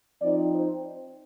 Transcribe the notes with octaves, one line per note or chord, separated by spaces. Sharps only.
F3 C4 D#4 D5
C5